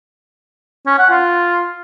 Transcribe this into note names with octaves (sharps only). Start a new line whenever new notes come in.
C#4
F#5
F4